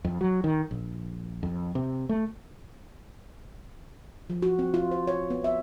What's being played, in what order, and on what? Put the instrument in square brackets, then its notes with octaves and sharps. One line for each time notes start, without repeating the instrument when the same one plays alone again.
[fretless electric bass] F2
F#3
D#3
A#1
F2
C3
A3
[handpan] F3
F#4
C4
F4
C5
C#5
B3
E5